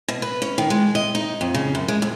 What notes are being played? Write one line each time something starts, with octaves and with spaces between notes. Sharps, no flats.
B2
B4
C#4
D#3
G#3
D#5
D#4
F2
C#3
F#2
G#3
F2